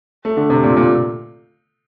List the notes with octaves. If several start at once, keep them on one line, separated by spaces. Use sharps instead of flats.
A3
D3
C3
A#2
A#2